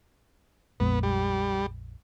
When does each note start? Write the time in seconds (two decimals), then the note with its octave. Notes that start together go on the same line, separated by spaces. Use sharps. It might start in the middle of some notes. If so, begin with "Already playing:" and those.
0.80 A#1 F2 G#3 B3
1.03 G3